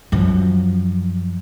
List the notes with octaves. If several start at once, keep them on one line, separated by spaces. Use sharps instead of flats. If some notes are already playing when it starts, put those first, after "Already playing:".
F#2 F3